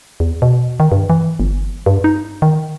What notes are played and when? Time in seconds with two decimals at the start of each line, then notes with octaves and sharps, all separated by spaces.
0.20 E2
0.42 B2
0.80 D#3
0.92 G2
1.10 E3
1.40 G1
1.86 G2
2.04 D#4
2.42 D#3